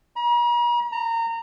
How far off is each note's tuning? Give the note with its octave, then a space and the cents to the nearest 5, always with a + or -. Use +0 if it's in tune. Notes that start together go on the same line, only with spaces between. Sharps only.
A#5 +45
A#5 -25